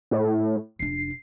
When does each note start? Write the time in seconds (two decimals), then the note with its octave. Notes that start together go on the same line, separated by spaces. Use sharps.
0.11 A2
0.79 F1 D4 C7